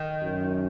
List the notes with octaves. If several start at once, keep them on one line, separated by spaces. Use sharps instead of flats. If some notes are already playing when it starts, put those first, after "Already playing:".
Already playing: D#3
F#2